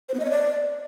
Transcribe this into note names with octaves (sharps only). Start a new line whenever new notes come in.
C5
B3
D#5
C#5
D5